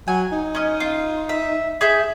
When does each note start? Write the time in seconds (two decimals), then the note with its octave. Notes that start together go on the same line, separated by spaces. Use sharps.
0.08 F#3 G#5
0.32 D#4
0.55 C#4 D#5
0.80 F4
1.29 E5
1.81 G#4 E5 G6